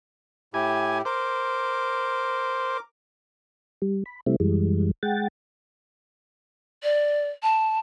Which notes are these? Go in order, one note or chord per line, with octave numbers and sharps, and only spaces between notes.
A2 E4 G4 G#5
A#4 C5 D6
G3
B5
C3 G3 A3 C4 E4
F#2 E3 G3 G#3
G#3 F#5 G5 A6
D5
A5